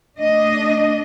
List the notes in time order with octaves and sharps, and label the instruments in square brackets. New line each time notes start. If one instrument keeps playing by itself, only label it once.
[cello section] A3 D4 D#5